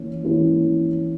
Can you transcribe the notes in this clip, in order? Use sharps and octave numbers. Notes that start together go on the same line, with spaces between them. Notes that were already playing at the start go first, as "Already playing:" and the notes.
Already playing: E3 A#3 C#4
E3 A#3 C#4 E4